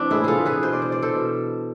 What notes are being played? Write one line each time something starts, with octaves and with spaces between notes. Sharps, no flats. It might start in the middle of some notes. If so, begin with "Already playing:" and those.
Already playing: E3 C4 D4
A2 E4 G#4
F4 G#4 A4
E3
G#4 B4
B2 C5
D5
C5
D5
A4 C5
B2